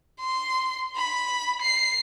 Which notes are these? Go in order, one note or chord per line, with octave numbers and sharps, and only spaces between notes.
C6
B5
C7